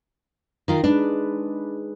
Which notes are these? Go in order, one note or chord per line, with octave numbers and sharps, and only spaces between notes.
D#3 F4 A#4
G#3 D4 D#4 B4